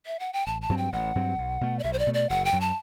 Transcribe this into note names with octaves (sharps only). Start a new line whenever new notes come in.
E5
F#5
G5
A1 A5
A5
G2 F#3 C4
G5
A1 F#5
G2 F#3 C4
B1
B2 A3
D5
B1 E5
C5
D5
B2 A3
D5
F#1 F#5
G5
F#2 F#3
A5